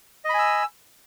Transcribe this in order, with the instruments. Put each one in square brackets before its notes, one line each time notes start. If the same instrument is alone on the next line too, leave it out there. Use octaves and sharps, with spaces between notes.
[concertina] D#5
B5
G#5
E6